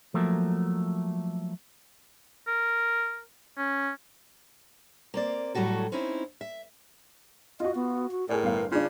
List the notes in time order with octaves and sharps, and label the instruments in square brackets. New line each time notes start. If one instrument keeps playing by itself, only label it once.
[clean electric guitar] F3 F#3 A3 A#3
[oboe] A#4
C#4
[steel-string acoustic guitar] A#3 C4 D5
A2 F#3 G3 F#4 A4
C4 C#4 D#4 E4
E5
[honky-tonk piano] F4 F#4 [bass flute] D#5
[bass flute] B3
F#4
[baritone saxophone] A2 [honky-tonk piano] G#4 D5 [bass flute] A#4
[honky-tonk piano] G1 F5
[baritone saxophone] C#3 [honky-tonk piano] D4 F4